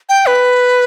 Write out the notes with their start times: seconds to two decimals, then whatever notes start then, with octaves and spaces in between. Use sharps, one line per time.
0.09 G5
0.26 B4